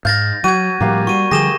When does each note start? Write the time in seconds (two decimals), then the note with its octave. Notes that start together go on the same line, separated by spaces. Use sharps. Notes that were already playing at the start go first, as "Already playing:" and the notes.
0.05 G#2 F5 G6 A6 A#6
0.44 F#3 F#4 G#6 D#7
0.81 A2 F3 G3 A#3 G4 F5
1.07 G3 F#4 C#6 D#7
1.31 D3 F3 G3 G4 G#4 A#6 E7 G7